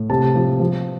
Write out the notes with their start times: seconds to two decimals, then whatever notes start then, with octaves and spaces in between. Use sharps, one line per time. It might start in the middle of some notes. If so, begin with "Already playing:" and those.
Already playing: A2
0.10 C3 A5
0.35 F3
0.60 F3